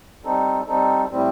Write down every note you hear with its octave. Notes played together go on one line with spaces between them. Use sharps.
G3 C4 D#4 A4
G3 C4 D#4 A4
A2 G3 C4